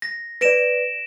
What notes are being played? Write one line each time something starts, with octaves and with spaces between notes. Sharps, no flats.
A#6
B4 D5 A#6 D7 E7